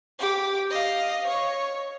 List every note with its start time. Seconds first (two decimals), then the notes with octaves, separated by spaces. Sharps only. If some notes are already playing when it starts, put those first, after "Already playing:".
0.19 G4 D6
0.70 D#5 F5
1.27 C#5